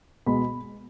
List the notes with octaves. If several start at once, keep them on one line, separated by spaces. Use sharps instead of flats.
B2 G#3 B5